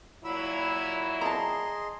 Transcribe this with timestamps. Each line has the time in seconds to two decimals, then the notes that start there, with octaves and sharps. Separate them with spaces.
0.24 A#2 F#3 E4 E5 B5 E6
1.21 G#4 D#5 A5 A#5 C6